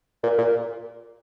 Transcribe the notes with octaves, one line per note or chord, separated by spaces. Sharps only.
A#2
A#2